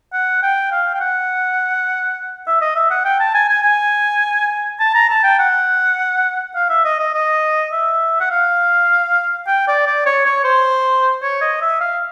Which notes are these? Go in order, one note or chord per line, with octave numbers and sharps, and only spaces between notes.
F#5
G5
F5
G5
F#5
E5
D#5
E5
F#5
G5
A5
G#5
G#5
G#5
A5
A#5
A5
G5
F#5
F5
E5
D#5
D#5
D#5
E5
F#5
F5
G5
D5
D5
C#5
C#5
C5
C#5
D#5
E5
F5